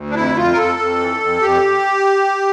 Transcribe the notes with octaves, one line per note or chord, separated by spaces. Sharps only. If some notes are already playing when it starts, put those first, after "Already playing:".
Already playing: D2
D4
F2 E4
F2 F4
A#4
F2 A4
F2
E3
F2
F2 G4